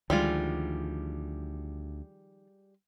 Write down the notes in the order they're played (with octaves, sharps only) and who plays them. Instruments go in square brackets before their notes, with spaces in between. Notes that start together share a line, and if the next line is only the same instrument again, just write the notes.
[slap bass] D2 [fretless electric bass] D#3 F3 [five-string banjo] G3 G#3 F4